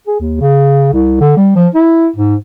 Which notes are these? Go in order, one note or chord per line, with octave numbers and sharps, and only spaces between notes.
G#4
D#2
C#3
C2
D3
G3
F3
E4
G#2